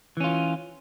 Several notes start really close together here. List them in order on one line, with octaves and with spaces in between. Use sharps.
E3 C#4 F4